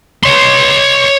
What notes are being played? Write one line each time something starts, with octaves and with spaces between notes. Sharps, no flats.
C#5 C6